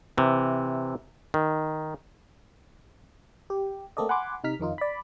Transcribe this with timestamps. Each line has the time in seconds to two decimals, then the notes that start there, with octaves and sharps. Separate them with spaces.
0.18 C3 E3
1.34 D#3
3.50 G4
3.97 A3 A#3 C4 A4 D5 D#5
4.09 F#5 G#5 B5 C6 D6
4.44 C3 D#4 F6 B6
4.60 F2 D#3 D#4 F4
4.78 D5 B5